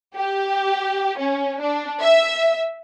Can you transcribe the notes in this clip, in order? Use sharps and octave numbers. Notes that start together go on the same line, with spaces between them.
G4
C#4
D4
E5